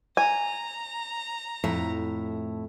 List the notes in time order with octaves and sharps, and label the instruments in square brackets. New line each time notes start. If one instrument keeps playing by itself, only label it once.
[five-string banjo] G#5 [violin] A#5
[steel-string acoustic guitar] F2 A2 E5